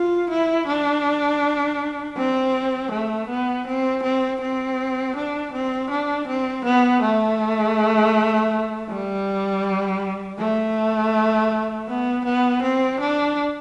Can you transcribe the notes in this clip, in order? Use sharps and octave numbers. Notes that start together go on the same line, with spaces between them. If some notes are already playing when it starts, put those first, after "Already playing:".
Already playing: F4
E4
D4
C4
A3
B3
C4
C4
C4
D4
C4
D4
C4
B3
A3
G3
A3
B3
B3
C4
D4